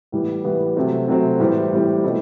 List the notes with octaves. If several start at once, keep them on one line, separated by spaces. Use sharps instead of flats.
A2 E3 G3 B3
A2 E3 G3 B3
C3 F#3 A3 C4
C3 F#3 A3 C4
A2 E3 G3 C4
A2 E3 G3 C4
B2 A3 C4 E4